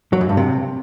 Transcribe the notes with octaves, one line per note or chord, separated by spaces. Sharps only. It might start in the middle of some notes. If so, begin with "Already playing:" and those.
F#3
F#2
G2
C3